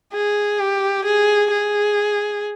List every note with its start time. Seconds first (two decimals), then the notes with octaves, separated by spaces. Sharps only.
0.13 G#4
0.60 G4
1.05 G#4
1.51 G#4